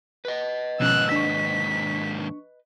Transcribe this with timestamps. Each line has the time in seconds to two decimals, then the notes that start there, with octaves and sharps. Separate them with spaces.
0.25 B4 D#5
0.80 D#2 G#2 B2 F3 C#4 E6 F#6
1.12 D4 C#6 B6